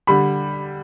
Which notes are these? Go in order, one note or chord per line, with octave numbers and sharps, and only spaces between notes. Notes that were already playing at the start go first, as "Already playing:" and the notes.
D3 G3 B5